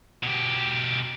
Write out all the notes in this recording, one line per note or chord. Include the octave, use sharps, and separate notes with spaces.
B2 G4